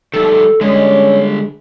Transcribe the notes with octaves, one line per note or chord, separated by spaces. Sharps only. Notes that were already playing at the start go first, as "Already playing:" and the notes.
D#3 G3 A3 A4
D3 G3 G#3 C#4